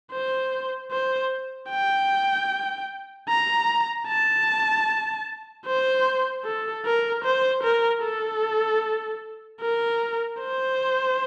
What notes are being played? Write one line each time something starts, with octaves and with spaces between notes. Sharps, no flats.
C5
C5
G5
A#5
A5
C5
A4
A#4
C5
A#4
A4
A#4
C5